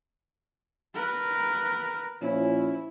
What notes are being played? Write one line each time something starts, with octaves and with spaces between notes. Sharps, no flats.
A#4 B4
A#2 F3 C#4 E4